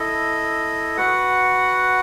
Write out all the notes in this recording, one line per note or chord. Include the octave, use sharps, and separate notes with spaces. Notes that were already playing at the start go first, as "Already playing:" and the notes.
Already playing: E4 A4 D#5
F#4 B4 F#5